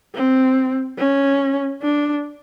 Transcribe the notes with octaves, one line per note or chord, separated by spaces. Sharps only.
C4
C#4
D4